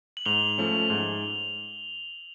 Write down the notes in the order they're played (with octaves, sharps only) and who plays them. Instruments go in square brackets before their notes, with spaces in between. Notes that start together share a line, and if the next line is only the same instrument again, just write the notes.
[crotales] F#7
[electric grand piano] G#2 [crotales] F7 G7
[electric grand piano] F3 A3 C#4
G#2